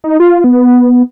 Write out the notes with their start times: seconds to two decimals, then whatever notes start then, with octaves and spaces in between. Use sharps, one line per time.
0.04 D#4
0.20 F4
0.44 B3